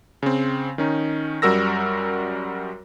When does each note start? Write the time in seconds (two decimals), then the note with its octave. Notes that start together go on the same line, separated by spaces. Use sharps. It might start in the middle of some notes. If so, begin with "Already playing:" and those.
0.23 C#3 C4
0.78 D#3 C#4 D#4
1.42 F#2 G3 F#4 A#4 E6 A#6